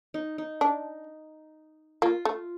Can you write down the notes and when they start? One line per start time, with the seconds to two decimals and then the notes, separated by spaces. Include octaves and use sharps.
0.14 D#4
0.38 D#4
0.61 D4
2.02 A#3 F4
2.25 A3